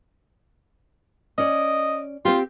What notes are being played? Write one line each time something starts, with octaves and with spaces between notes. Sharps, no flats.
C#4 D5 D#5
C4 F4 G4